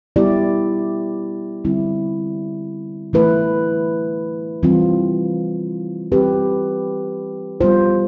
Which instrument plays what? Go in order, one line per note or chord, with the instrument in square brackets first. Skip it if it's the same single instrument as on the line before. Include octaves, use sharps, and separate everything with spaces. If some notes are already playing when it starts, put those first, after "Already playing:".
[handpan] G3 B3 E4 G4 D5
D3 G3 C4 E4
E3 A3 E4 B4
E3 G3 C4 F4
E3 G3 C4 G4 B4
G3 B3 F4 C5